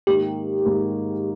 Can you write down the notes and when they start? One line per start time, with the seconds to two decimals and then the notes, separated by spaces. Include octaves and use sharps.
0.07 G#2 D#3 A#3 G4
0.65 G#2 D#3 A#3